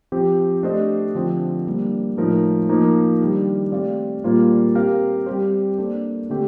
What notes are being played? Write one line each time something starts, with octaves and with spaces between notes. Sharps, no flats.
F3 C4 G4
A3 D4 G4 C5 D#5
D3 F3 C4 G4
G3 A#3 D4
A2 F3 A3 D#4 A#4
F3 A#3 D#4 A#4
D#3 G3 D4 G4
A3 C4 G4 D5 F5
A#2 G3 A#3 F4 C5
C4 G4 A#4 F5
G3 C4 G4 C5
A#3 D4 A4 D5
D3 A3 C4 G4